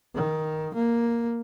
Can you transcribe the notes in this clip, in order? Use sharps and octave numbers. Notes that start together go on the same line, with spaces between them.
D#3
A#3